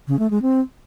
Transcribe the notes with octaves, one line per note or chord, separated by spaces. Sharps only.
C#3
A3
G#3
C4